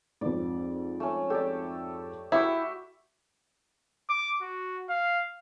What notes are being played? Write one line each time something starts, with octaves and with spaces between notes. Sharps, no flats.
F2 G#2 D5
A3 C#4
G4 A4 D5
E4 F#4 G4 E5 G5 C#6 E6
D6
F#4
F5